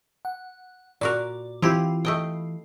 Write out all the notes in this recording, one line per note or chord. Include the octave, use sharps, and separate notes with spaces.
F#5
A#2 F#4 A#4 D5
E3 C4 E4 F4 G4
A3 D#5 G5